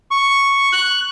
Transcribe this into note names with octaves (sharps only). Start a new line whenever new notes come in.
C#6
F#6